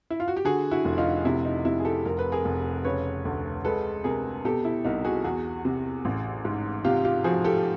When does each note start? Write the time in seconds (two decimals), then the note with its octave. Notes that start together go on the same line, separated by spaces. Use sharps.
0.10 E4
0.20 F4
0.28 F#4
0.37 G4
0.45 D3 F#4 G#4
0.71 E4 F#4
0.85 F1
0.98 D#4 F4
1.25 C3 E4
1.45 D#4
1.65 C3 E4
1.80 G#4
1.85 G4 A4
2.05 F1 A#4
2.19 B4
2.32 G#4 A#4
2.45 F1
2.84 C#3 B4 C#5
3.25 D2
3.65 G#3 A4 B4
4.04 C3 G#4 A#4
4.45 B2 G4 A4
4.65 E4
4.85 C2 D#4
5.05 F#4 G#4
5.24 E2 F#4 G#4
5.65 C3
6.05 A1
6.45 G#2
6.85 C3 F4 G4
7.05 F4 G4
7.24 F3 F#4 G#4
7.44 G4 A4